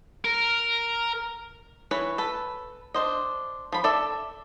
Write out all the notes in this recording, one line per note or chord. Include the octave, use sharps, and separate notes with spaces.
A#4
E3 B4 C#5
A4 B4
D4 C5 D#5
F3 B5
A4 D5 E5